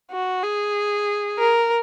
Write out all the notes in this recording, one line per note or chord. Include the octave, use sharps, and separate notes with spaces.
F#4
G#4
A#4